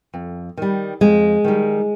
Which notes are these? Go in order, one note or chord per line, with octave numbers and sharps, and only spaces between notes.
F2
D#3 G3
F2 G#3
D#3 G3